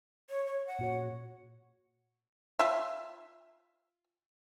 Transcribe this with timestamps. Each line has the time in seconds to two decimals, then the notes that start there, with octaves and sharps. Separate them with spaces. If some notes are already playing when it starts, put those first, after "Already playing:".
0.30 C#5
0.46 C#5
0.67 F#5
0.79 A#2 F#4 C#5
2.59 F4 E5